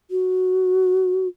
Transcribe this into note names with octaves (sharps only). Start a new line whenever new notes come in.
F#4